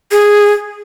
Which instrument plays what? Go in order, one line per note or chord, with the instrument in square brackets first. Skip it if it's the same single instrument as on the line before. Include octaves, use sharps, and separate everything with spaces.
[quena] G#4